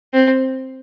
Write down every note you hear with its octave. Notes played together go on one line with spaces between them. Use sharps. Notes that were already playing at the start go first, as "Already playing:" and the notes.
C4